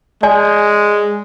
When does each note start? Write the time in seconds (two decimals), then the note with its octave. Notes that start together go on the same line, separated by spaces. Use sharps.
0.23 G#3 D5 G#5